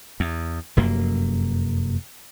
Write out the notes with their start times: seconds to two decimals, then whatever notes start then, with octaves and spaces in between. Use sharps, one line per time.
0.20 E2
0.77 F1 F#2 A#3